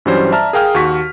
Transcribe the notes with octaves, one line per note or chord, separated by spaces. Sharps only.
G2 E3 F#3 G3 C#4 C5
D5 E5 A5 A#5 F6
G#4 A#4 F5 G5 D#6 F6
D#2 F#4 C#6 B6